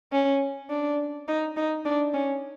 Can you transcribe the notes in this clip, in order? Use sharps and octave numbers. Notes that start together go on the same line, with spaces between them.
C#4
D4
D#4
D#4
D4
C#4